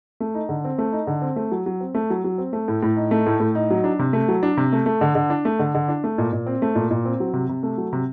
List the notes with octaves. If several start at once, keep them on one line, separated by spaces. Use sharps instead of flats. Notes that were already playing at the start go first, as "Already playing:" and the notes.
A3
D#4
D3
C4
A3
D#4
D3
C4
A3
F#3
F#3
C4
A3
F#3
F#3
C4
A3
A2
A2
D#4
A3
A2
A2
D#4
F#3
D4
C3
A3
F#3
D4
C3
A3
A3
D3
D3
D4
A3
D3
D3
D4
A3
A#2
A#2
C4
A3
A#2
A#2
C4
F#3
C3
C3
A3
F#3
C3